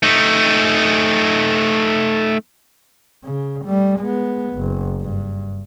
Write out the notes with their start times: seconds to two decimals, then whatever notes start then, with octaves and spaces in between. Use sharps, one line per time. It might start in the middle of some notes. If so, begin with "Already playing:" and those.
0.03 A3 D#4
3.24 C#3
3.65 G3 A3
3.99 G#3 B3
4.54 F#1
5.01 G2